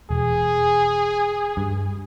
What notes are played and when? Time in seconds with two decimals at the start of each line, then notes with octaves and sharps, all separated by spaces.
0.10 E1 G#4
1.57 G2